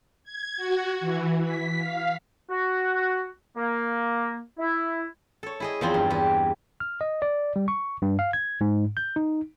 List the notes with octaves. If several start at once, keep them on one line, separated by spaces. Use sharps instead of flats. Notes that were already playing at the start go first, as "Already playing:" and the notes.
G#6
F#4
E3
B6
F5
F#4
A#3
E4
A4 C#5
E4 G#4 D#5
E2 F3 C4 F4 A#5
G2
E2 G4
F6
D#5
D5
G3
C#6
G2
F5
G#6
G#2
G6
D#4